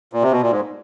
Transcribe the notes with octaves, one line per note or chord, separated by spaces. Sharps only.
A#2
C3
B2
A#2
G#2